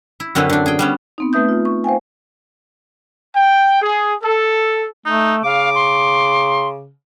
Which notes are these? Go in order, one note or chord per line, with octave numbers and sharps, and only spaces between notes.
E4
F#2 D3 C4 C#4 E4 B4
D3 D4
G#4 G5
G3 B3 C#4
B3 C4 D#4
A3 B4 E5 D#6 G6
F4
C#6
C5 F5 G5 G#5
G5
G#4
A4
A3 D#4
C#3 F5 D6
C6